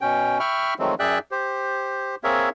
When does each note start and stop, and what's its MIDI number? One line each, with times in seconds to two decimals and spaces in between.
0.01 0.39 47
0.01 0.39 61
0.01 0.39 79
0.40 0.74 76
0.40 0.74 79
0.40 0.74 83
0.40 0.74 85
0.40 0.74 89
0.79 0.95 51
0.79 0.95 53
0.79 0.95 54
0.79 0.95 56
0.79 0.95 57
0.79 0.95 60
0.99 1.19 42
0.99 1.19 68
0.99 1.19 74
0.99 1.19 76
0.99 1.19 79
0.99 1.19 90
1.31 2.15 67
1.31 2.15 72
2.24 2.49 58
2.24 2.49 60
2.24 2.49 68
2.24 2.49 70
2.24 2.49 73
2.24 2.49 76